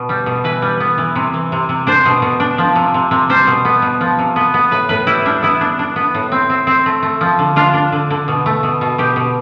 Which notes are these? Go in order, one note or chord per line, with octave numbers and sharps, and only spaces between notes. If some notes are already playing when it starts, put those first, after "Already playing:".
Already playing: B2
G3
B2
E3 B4
G3
B3
E3
C3
E3
C3
C3
D4 C5
B2
B2
D4
F3
C3
C3
C3
G3 C5
B2
B3
B2
F3
C3
B3
B3
A2 B4
A2 B4
G3 E4
G3 D4
B3 E4
D4
D4
B3
A2
C4
C4
C4
A3
A3
F3
D3
D4 F4
D4
D3
D3
B2
A3
B2
B2
B2 G4
B2